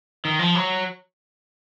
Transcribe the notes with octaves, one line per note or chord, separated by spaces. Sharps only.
D#3
F3
F#3